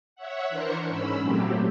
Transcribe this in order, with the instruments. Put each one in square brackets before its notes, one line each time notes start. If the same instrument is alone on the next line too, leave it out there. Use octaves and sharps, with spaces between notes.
[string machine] C#5 E5 F#5
E3 D4 A#4 C5 C#6
G#2 C#4 B5 E6
A#2 F#3 A3 C4 G4